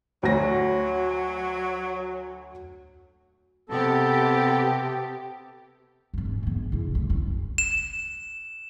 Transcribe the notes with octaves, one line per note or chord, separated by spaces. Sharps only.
D2 F#3 C#5 A#6
C3 B3 G4 A4 A5
G#1 G#2
G#2
G#2 B3
C#3 E4
F1 D2
F#2 C#3
E7